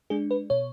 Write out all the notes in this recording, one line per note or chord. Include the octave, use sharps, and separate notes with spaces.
G#3 D4 G#4
B4
B2 C#5